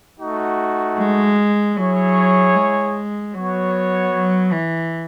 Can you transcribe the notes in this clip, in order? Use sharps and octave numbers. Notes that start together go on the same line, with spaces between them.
A3 D#4 F#4
G#3
F#3 E4 G#4 C#5
G#3
F#3 B3 F#4 C#5
F#3
E3